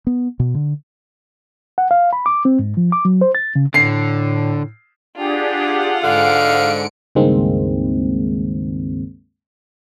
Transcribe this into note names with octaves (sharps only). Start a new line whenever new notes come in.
B3
B2
D3
F#5
F5
B5
D6
C4
G#2
F3
D6
F#3
C5
A6
C#3
A2 D3 C7
D4 F4 G4 G#4 F#5
G#2 D3 F5 C#7 D7
C#2 G2 D#3 G#3 A#3 C4